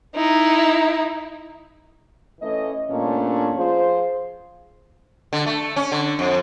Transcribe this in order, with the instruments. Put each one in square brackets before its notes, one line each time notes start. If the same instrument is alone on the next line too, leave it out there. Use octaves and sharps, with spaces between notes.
[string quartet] D#4 E4
[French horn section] E3 A3 C#4 D#5
G2 A#2 A3 C#4 D4
F3 F4 G#4 C5
[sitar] D3
A3
C#4
D3
F2